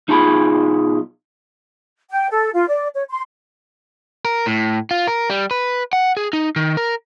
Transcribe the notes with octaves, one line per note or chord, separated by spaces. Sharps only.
B1 D#4 F4 G#4 A5 B5
G5
A4
F4
D5
C#5
C6
A#4
A2
F4
A#4
G3
B4
F#5
G#4
D#4
D#3
A#4